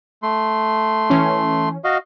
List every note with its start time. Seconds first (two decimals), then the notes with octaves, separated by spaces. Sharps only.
0.23 A3 C6
1.10 E3 C#4
1.84 F#4 D#5 F5